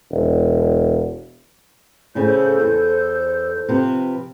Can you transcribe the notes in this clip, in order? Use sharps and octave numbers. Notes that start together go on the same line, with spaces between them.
E1
A2 C#3 A4 C5 G6
E2
C3 F3 B4